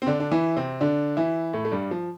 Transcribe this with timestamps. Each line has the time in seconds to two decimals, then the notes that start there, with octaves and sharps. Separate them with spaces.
0.02 C4
0.07 D3 D4
0.20 D4
0.31 E3 E4
0.57 C3 C4
0.81 D3 D4
1.17 E3 E4
1.53 A2 A3
1.65 A3
1.72 G2 G3
1.91 F3